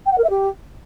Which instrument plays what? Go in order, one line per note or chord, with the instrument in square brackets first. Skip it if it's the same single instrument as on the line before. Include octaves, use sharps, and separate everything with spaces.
[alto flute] G5
F#5
A#4
E5
G4